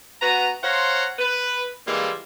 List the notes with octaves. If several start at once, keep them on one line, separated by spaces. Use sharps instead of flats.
B3 F#4 B4 A#5
C5 C#5 F5 F#5 A#5 C6
B4
E3 G3 G#3 A#3 E4 F4